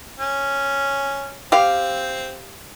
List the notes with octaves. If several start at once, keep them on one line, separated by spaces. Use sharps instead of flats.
C#4
C4 G4 F5